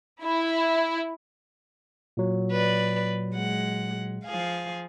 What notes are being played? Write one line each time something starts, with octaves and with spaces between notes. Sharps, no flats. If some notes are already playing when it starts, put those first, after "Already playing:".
E4
A#2 F#3
B4 D5
G#3 F#5
F3 G#4 F5